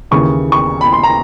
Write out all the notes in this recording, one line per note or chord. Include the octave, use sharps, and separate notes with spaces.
D#2 C#3 E3 C#6
C#6
B5
C6
A#5